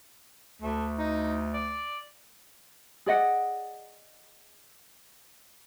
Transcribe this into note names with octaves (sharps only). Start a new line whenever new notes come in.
D2 A3
D#4
D5
G#4 D5 D#5 F#5